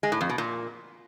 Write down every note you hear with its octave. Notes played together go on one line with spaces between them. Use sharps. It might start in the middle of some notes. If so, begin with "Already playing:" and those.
G#3
A2
F2
B2
A#2